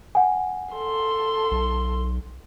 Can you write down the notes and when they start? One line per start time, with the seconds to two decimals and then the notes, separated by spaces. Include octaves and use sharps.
0.15 F#5 G#5
0.74 A4 C6
1.51 B1